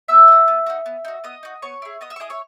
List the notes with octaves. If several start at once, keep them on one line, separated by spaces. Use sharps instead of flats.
B3 E5 E6
D#4 F#4
B3
D#4 F#4
B3
D#4 F#4
B3 D#5 D#6
D#4 F#4
B3 C#5 C#6
E4 G#4
B3 D#5 D#6
E5 E6
C#6
E4 G#4 D#5 D#6
C#5 C#6